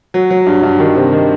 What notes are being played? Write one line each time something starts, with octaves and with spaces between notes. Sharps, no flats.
F#3
F#3
G2
G2
D#3
C3
D#3